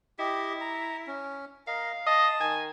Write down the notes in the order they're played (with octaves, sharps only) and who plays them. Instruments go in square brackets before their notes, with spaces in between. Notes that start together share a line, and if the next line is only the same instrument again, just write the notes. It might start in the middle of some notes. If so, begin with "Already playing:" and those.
[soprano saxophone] E4 [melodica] G4 D#5
[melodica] A#5
C#4
[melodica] A#4 D#5 [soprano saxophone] F5
[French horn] D#5 [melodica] A5
[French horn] D#3 [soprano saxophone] G#5